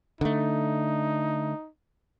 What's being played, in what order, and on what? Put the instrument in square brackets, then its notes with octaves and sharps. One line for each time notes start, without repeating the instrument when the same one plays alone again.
[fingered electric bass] D3 A3 [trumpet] D#4